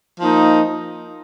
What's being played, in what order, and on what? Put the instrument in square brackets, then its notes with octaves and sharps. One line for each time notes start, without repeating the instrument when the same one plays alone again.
[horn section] F3 A#3 D#4